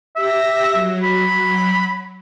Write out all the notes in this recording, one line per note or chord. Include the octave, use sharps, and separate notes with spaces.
G4 E5 A#6
F#3
B5